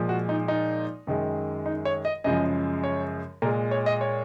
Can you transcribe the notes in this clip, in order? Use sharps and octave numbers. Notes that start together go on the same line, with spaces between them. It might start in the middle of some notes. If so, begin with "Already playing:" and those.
Already playing: A#2 F3 G#3
F#4
D#4
D#4
F#2 D#3 G#3
D#4
C#5
D#5
F#2 C#3 F3 G#3 D#5
C#5
A#2 G#3 A#4
C#5
D#5
C#5